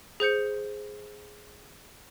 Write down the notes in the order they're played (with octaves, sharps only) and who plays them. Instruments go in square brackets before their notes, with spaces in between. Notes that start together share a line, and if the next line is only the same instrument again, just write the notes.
[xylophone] G#4 C5 G6 C#7